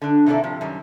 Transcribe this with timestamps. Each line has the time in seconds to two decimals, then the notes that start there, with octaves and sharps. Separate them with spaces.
0.02 D3 D4
0.26 C3 D#3 A#3 E4 A4 D5
0.44 A2 C3 F3
0.61 F#2 D#3 G3